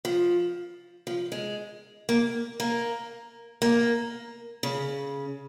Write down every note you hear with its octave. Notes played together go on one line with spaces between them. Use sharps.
F3
F3
G#3
A#3
A#3
A#3
C#3